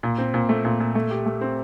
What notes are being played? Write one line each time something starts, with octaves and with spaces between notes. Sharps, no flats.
A#2
C4
A#2
A3
A#2
A#2
A3
G4
A3
C4